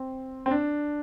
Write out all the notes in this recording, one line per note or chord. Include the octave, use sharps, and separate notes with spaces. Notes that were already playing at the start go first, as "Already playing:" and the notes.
Already playing: C4
C4
D4